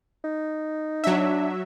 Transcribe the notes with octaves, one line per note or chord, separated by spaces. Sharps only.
D#4
F#3 D4 E5